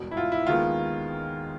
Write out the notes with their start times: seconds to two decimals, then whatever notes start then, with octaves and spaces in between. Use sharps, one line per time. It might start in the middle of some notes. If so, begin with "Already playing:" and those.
Already playing: E1 E2 B2 G3
0.11 E4
0.17 F4
0.32 E4
0.47 D#2 D#3 G#3 B3 F4